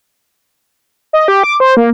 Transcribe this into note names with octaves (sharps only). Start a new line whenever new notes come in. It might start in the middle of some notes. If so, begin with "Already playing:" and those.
D#5
G4
D6
C5
A#3